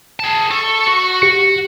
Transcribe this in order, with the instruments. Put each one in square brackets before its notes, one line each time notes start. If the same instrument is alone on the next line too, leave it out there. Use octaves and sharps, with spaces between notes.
[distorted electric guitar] G#4 A5
[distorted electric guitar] A4 [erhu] C#6
[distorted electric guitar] F#4
[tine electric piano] G4 C#7